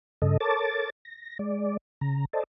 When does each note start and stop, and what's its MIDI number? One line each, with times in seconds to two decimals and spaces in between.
0.22 0.37 43
0.22 0.37 49
0.22 0.37 69
0.22 0.37 75
0.40 0.90 69
0.40 0.90 70
0.40 0.90 73
0.40 0.90 81
0.40 0.90 86
0.40 0.90 93
1.05 1.38 94
1.39 1.77 56
1.39 1.77 74
2.01 2.25 49
2.01 2.25 82
2.33 2.43 69
2.33 2.43 72
2.33 2.43 74
2.33 2.43 75
2.33 2.43 81